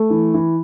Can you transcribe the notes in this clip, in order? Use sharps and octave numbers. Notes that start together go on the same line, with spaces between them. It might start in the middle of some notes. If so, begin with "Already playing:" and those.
Already playing: A3
E3
E3